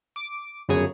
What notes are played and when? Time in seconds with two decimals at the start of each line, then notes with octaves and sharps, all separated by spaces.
0.16 D6
0.68 G1 F#2 C#3 F#3 G#4 C#5